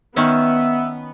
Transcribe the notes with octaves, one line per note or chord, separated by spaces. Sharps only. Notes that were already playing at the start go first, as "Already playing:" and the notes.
D#3 B3 C#4 E5